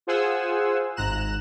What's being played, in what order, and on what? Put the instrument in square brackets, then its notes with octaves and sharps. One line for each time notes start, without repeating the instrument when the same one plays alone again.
[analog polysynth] F4 G#4 C5 F#5 G#5 E6
G#1 G#2 A#5 F#6 E7